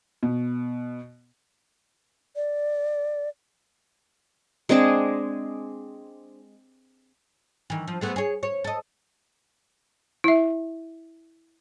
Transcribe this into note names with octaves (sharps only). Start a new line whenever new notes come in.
B2
D5
G#3 C4 D4 G#4
D#3 E3
F3
G#3 A3 B3
G#4 C#5
C#5
A4 D#5
E4 E5